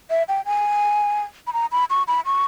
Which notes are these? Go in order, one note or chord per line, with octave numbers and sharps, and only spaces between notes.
E5
G5
G#5
B5
A#5
B5
C#6
B5
C#6